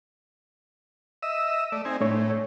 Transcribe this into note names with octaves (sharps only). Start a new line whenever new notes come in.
D#5 E5 E6
A3 D5
C4 D#4 G#5
A2 A3 D4 C#5